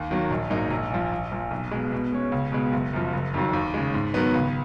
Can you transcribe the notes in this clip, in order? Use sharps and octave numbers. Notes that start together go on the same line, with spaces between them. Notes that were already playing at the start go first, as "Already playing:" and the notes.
Already playing: D#2
D#3 F#3 A#3
A#1
G#2 F#3 A#3 D#4
A#1
A#2 F3
A#1
A#2 F3
B1
B2 G#3
B2
G#3 C#4
C#2
B2 G#3
F#1
F#2 F3
F#1
F2 D#3 F#3
D#2
C#3 G#3
G#2
D#3 F#3 B3
C#2